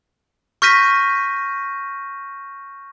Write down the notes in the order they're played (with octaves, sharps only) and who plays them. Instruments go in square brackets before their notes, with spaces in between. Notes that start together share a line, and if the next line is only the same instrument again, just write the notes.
[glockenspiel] C#6 F6 G6 A#6 B6 D#7